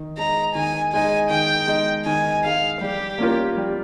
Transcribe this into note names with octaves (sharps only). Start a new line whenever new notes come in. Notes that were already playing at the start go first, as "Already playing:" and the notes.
Already playing: D#3
G#3 D#4 A#5
D#3 G#5
G#3 D#4 G#5
D#3 G5
G#3 D#4
D#3 G#5
G#3 D#4 F5
G3 G4
A#3 C#4 F4 A#4
G3